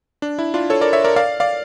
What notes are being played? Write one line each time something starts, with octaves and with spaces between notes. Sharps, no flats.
D4
E4
D4 F4
A4 C#5
A#4 D5
C#5 E5
A#4 D5
D5 F5
D5 F5